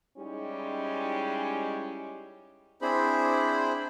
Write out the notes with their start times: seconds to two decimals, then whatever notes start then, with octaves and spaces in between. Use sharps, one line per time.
0.18 G3 G#3 C#4 D#4 E4 G4
2.82 C4 D4 E4 G#4 C5 B5